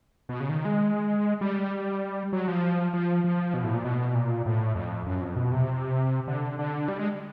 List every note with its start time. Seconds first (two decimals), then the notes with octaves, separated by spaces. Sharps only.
0.29 B2
0.40 C#3
0.49 D#3
0.65 G#3
1.41 G3
2.33 F#3
2.48 F3
2.94 F3
3.24 F3
3.54 B2
3.64 A2
3.74 A#2
3.85 B2
4.15 A#2
4.46 A2
4.75 F2
5.06 F#2
5.21 F2
5.36 B2
5.52 C3
6.27 D3
6.59 D3
6.88 G3
6.99 G#3